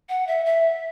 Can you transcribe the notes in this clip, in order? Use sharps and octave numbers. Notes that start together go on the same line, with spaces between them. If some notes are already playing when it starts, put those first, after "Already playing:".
F#5
E5
E5